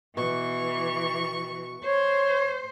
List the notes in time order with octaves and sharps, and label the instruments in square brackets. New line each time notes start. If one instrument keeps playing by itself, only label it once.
[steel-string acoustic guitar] B2 [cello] E3 [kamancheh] C#6
[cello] C5 [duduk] C#5